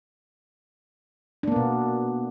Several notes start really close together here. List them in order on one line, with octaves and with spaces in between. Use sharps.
D4 A#3 B3 B2